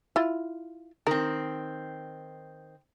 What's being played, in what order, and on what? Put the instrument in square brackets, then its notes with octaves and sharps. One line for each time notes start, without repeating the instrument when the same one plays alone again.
[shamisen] E4 F4
[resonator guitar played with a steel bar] D#3 C4 [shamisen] A#4